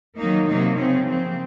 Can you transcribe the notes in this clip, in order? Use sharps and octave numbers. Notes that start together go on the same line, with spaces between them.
D#3 F#3 A#3 D#4
C3 F#3 A#3 D#4
C#3 F#3 C4 C#4
C#3 F3 A#3 C4